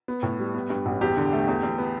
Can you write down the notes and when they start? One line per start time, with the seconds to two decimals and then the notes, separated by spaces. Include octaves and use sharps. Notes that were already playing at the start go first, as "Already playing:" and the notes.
0.08 B3
0.23 A2
0.39 G3
0.54 B3
0.70 G2
0.86 A1
1.01 E2 G4
1.17 D3
1.33 A3
1.48 E2
1.63 E2
1.78 B3